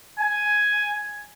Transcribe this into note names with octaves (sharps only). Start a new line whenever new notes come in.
G#5